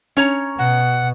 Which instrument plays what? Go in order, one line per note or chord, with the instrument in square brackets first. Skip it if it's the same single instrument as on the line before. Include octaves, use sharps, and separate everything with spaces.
[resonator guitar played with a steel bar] C#4 C#5 A#5
[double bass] B2 [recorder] F#5